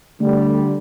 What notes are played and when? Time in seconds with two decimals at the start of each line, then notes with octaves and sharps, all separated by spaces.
0.20 D3 G3 A3